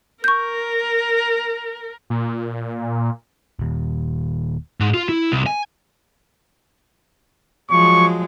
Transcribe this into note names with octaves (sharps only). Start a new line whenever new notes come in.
A#4 C#6 G6
A#2
D#1 D#2
G#2
F4
E4
C2
G#5
F3 F#3 G#3 C#6